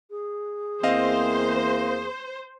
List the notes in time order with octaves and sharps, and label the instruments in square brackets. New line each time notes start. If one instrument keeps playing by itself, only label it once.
[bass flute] G#4
[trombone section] E2 E3 A#3 [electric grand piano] C4 D#5 F5 [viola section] C5